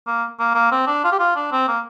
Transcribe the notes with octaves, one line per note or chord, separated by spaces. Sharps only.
A#3
A#3
A#3
C4
D4
F4
G4
F4
D4
C4
A#3